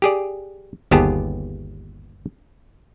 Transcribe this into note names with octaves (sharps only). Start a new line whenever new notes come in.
G4 G#4 D5
G1 D#2 B3 G4 G#4 A5